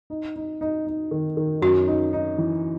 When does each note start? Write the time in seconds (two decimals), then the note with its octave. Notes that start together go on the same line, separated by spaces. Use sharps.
0.10 D#4
0.36 D#4
0.61 D#4
0.87 D#4
1.11 D#3
1.37 D#3
1.62 F#2 F#4
1.87 D#4
2.13 D#4
2.38 E3